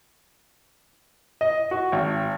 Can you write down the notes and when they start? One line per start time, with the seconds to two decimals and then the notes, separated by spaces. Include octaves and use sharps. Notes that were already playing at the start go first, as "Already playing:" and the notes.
1.41 D#5
1.71 F#4
1.92 G#1